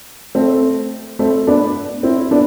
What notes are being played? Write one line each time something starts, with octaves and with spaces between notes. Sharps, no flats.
A3 C4
A3 C4
B3 D4
C4 E4
B3 D4